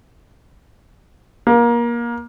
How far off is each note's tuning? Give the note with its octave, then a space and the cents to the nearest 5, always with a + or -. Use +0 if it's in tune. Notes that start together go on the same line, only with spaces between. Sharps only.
A#3 +25